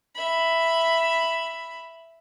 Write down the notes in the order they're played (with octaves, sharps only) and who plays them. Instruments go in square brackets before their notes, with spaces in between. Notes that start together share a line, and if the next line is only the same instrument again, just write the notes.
[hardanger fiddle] E5 B5